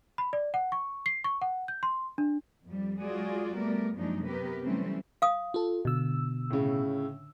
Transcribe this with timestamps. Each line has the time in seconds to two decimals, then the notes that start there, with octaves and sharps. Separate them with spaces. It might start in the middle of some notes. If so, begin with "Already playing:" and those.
0.18 B5
0.33 D5
0.54 F#5
0.72 C#6
1.06 C7
1.24 C#6
1.42 F#5
1.68 G6
1.83 C6
2.18 D4
2.65 F2 G3
3.01 F#3 G#3 F4 F#4 G#4 D5
3.58 G3 A3 B3 A#4 D5
3.97 F#2 F3 G#3 A#3 D4 D#4
4.26 C3 B3 G4 A#4 B4
4.63 E3 F#3 G3 A3 C4 C#4
5.22 F5 D#6
5.54 F4 A4
5.85 B2 D3 E6
6.50 A2 C#3